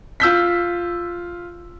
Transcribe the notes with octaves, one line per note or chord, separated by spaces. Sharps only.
F4 E6 G6 B6